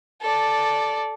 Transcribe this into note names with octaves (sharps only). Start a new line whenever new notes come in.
A4 D5